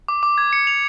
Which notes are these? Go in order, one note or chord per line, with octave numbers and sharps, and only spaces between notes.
D6
D6
G#6
C#7
F7